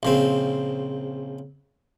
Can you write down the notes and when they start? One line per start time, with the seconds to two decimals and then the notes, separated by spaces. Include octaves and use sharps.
0.03 A#1 C#3 C4